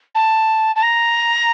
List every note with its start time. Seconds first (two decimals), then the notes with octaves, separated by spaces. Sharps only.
0.15 A5
0.76 A5
0.82 A#5